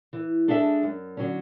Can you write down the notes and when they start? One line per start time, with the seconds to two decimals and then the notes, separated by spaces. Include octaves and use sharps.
0.13 E3
0.48 G#3 D4 A4 E5
0.83 F#2
1.17 D3 F#3 C#4